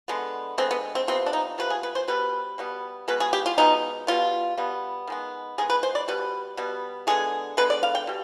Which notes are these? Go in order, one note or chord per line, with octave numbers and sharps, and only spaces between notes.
D3 G#3 B3
D3 G#3 B3 C4
B3
C4
C3 F3 B3 C4
D4
D#4
C3 F3 B3 B4
G#4
B4
C5
B2 G3 B3 B4
B2 G3 B3
B2 G#3 B3 B4
G#4
G4
F4
B2 G#3 B3 D#4
B2 G3 B3 F4
B2 G3 B3
D#3 G#3 B3
D#3 G#3 B3 G#4
B4
C5
D5
B2 G3 B3 B4
B2 G3 B3
D3 G#3 B3 G#4
D3 G#3 B3 B4
D5
F5
G5
B2 G3